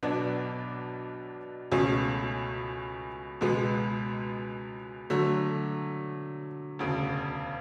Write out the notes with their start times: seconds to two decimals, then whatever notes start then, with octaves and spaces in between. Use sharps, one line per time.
0.03 B1 B2 F#3 B3 D4
1.72 C#2 B2 A3 C#4 G#4
3.41 C#2 B2 G#3 B3
5.10 D3 F#3 A3
6.79 E1 D2 C#3